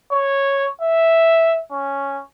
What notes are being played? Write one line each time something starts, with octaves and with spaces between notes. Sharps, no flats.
C#5
E5
C#4